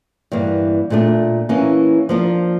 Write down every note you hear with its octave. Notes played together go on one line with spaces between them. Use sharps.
G2 E3 A#3
A#2 A3 D4
E3 A#3 C#4
F3 A#3 D4